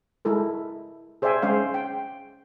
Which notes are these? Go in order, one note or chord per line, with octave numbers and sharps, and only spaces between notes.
G#3 E4 A4 A#4
G#4 C5 D5 E5 G5 G#5
G#3 C#4 C5 F5
G5